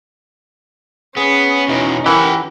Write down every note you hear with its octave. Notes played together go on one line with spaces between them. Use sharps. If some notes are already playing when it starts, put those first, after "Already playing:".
B3 C#4 G#4
E2 B2 D#4
E3 G4 A#4 F#5